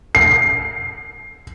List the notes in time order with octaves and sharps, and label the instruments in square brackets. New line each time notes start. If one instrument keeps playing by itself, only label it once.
[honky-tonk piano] C7